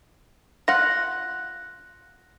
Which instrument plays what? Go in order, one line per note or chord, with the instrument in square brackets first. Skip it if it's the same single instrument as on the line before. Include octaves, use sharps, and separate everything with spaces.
[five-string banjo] F4 F#5 [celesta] F#6 A#6